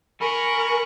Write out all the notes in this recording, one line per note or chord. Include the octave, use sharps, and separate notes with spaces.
A#4 G#5 B5 C#6